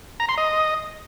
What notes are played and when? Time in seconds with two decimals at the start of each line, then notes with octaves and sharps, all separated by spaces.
0.20 A#5
0.29 C6
0.38 D#5